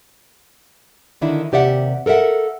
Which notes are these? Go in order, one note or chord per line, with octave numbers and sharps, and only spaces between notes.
D3 D#3 D4 E4
D#2 C3 G4 D5 E5 F#5
A4 A#4 D5 E5 F#5